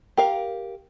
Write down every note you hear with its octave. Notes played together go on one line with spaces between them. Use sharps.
G4 A#4 F5